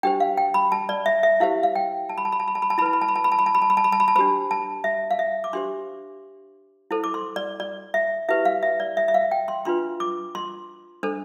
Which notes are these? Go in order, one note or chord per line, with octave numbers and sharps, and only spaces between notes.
D4 G4 C5 G5
F5
G5
B5
A5
D5
E5
E5
E4 G4 C5 F5
F5
G5
A5
B5
A5
B5
A5
B5
A5
B5
A5
E4 B4 A5 B5
B5
A5
B5
A5
B5
A5
B5
A5
B5
A5
B5
A5
B5
A5
B5
A5
D4 G4 C5 B5
A5
E5
F5
E5
D6
D4 G4 C5 C6
E4 A4 C5
D6
C6
D5
D5
E5
E4 G4 B4 E5
F5
E5
D5
E5
E5
F5
G5
C6
D4 F4 B4 C6
D6
C6
D4 A4 C5